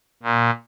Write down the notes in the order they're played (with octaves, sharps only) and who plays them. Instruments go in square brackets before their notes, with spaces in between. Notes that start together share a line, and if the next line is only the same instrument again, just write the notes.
[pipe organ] A#2